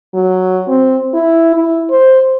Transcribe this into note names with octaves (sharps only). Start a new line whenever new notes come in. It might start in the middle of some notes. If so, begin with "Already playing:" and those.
F#3
C4
E4
E4
C5